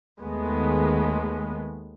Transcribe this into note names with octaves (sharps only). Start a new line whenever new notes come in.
D#2 D#3 G#3 A3 B3